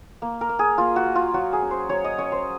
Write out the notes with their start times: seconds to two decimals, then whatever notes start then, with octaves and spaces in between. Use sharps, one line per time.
0.22 A#3
0.41 A#4
0.49 A#3
0.59 G#4
0.78 A#3 F4
0.96 F#4
1.06 A#3
1.15 F4
1.34 F#3 F#4
1.53 G#4
1.62 C#4
1.71 C5
1.89 F#3 C#5
2.04 D#5
2.18 C#4 C#5
2.32 C5